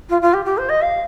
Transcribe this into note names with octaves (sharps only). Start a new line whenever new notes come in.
F4
F4
G4
G4
C5
D#5
F5